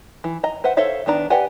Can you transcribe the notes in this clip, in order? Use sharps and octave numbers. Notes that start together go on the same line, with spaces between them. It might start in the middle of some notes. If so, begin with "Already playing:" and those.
E3
D#5 A#5
B4 C5 E5 F#5
A4 C5 C#5 E5 F5
D#3 B3 D4 A#5
G4 B4 D5 F#5 G#5